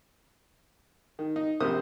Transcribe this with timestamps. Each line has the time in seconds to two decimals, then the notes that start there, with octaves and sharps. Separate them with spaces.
1.19 D#3
1.36 D#4
1.60 A#1 C3 A#3 C5 D#6